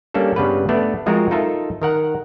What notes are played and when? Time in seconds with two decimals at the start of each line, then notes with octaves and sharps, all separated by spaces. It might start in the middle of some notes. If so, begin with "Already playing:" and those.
0.14 G3 A#3 C#4 D4 A4
0.36 G2 C#3 G3 B3 B4
0.69 A3 B3 D4 D5
1.06 F3 G#3 C4 F4 F#4 A#4
1.31 D#4 F4 A4 A#4 E5
1.82 D#3 A#4 F#5